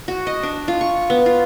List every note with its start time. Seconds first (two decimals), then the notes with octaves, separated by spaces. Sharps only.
0.08 F#4
0.27 D#5
0.43 D4
0.68 F4
0.81 C#6
1.10 B3
1.26 F4